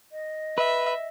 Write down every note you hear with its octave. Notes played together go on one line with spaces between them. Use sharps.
D#5
B4 E5